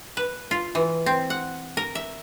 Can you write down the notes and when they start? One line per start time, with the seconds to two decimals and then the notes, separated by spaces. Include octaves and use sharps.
0.17 B4
0.51 F4
0.75 E3
1.06 C4
1.30 F#5
1.77 A#4
1.95 E5